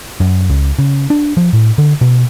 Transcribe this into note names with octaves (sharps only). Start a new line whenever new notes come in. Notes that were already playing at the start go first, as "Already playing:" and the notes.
F#2
C#2
C#3
D4
F3
A2
D3
B2